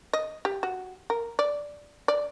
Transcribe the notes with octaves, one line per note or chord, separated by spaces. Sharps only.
D#5
G4
F#4
A#4
D5
D5